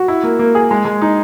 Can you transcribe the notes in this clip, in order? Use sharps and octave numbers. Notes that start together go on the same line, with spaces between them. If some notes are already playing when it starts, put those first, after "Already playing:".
Already playing: F#4
E4
A#3
A#3
G#4
G#3
G#3
D#4